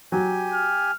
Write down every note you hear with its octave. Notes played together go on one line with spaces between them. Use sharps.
F#3 G4 G#5
F6